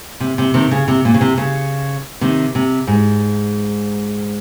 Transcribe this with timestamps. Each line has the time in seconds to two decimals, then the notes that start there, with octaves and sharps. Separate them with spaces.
0.20 C3
0.38 C3
0.54 C3 D#3
0.71 C#3
0.88 C3
1.05 A#2
1.14 C#3
1.21 C3
1.38 C#3
2.21 C3 D#3
2.55 C3
2.87 G#2